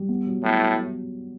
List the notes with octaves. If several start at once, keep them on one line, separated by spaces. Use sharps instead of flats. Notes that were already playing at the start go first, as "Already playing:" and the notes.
Already playing: G3
B3
F#3
A2 B3
F#3